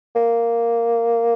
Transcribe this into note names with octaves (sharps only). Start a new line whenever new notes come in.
A#3